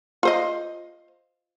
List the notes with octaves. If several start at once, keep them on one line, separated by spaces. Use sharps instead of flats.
F4 C5 D#5